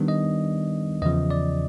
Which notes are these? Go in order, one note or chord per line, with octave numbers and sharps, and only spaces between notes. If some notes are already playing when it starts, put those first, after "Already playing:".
Already playing: D#3 G3 B3 D4
D#5
E2 C#3 F3 D#5
D5